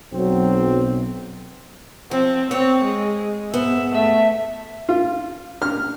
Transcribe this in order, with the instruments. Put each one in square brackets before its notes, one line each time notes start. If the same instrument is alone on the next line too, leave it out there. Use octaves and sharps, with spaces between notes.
[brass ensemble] B1 [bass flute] F#3 [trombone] C4
[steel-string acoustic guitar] F3 [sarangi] C4
[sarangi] C4 [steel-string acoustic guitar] C#5
[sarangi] G#3
[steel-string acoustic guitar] G#2 B3 [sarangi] E5
[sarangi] A3 [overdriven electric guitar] E5
[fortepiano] F4
F6